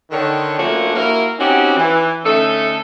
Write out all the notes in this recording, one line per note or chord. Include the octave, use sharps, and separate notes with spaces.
D3 D#3 C#5
F3 A3 A#3 C#4 D4 F#4
A#3 E4 F#4 A#4
C4 C#4 D#4 F#4 G4
E3
D3 A3 C#4 D#4 A4